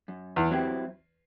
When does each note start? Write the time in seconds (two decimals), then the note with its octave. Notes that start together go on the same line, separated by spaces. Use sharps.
0.08 F#2
0.36 E2
0.51 F#3 C4 E4 G4